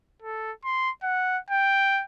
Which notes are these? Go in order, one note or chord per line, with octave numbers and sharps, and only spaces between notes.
A4
C6
F#5
G5